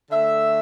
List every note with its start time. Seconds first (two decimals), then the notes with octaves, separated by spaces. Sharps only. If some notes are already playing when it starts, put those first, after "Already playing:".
0.10 D3 A3 E5